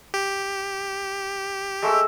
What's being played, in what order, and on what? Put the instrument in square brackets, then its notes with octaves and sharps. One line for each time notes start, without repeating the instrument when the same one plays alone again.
[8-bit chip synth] G4
[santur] G#3 A3 E6